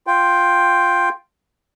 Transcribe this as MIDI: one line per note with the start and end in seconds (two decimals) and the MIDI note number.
0.07 1.09 65
0.07 1.09 79